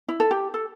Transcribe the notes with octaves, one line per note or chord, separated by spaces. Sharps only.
E4
A4
G4
A4